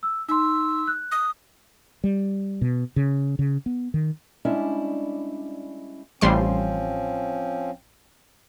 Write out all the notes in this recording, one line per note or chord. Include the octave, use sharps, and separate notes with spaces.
E6
D#4 C6 E6
F#6
D#6
G3
B2
C#3
C#3
B3
D#3
G3 G#3 C#4 D4 E4
A1 F3 G3 C4 C#4 C6